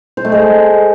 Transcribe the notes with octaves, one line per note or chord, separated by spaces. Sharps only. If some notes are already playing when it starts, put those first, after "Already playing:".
C5
A3
G#3